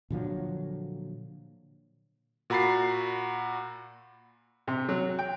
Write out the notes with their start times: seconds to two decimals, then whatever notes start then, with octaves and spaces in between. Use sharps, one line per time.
0.10 A#2 D3 F3 F#3
2.50 A#2 F#4 A#5 B5 A6 C7
4.68 C3
4.89 F#3
5.19 G5